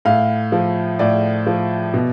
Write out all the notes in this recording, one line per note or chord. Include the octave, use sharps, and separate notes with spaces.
A2 F5
F3
A2 D5
F3
B2